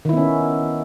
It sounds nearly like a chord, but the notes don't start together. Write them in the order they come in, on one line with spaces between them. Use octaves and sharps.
D#3 E4 B3 C#4